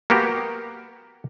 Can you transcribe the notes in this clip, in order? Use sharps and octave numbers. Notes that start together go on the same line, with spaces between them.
A#3 B3 F#4 G4